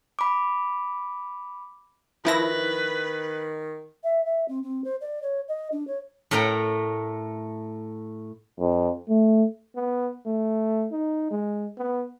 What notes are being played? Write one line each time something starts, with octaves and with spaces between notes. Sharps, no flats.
B5 D6
D#3 F3 E4 B4 A#6
E5
E5
C4
C4
C5
D5
C#5
D#5
D4
C#5
A2 A3 A#4 G5 A#5
F2
A3
B3
A3
D#4
G#3
B3